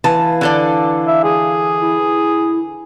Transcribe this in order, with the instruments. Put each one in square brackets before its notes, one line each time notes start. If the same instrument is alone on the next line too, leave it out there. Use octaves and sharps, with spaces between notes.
[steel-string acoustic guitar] E3 [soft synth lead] F5 [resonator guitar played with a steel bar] A5
[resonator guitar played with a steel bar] D3 A4 D5
[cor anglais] E5
G#4
[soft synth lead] E4